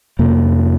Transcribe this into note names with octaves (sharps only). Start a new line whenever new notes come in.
F2 C3 A#3